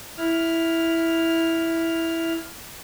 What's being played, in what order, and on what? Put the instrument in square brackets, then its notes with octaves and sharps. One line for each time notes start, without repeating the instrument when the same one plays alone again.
[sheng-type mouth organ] E4 F6